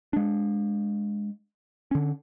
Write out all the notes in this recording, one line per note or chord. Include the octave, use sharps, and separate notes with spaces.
G#3 D4
D3 C#4